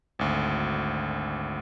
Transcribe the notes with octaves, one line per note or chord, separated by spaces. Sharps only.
G#1 D2